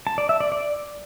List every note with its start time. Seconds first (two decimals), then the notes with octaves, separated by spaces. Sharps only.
0.07 A5
0.18 D5
0.29 E5
0.40 D5
0.52 D5